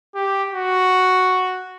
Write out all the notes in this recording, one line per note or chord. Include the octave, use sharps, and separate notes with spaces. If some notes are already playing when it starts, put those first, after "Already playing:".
G4
F#4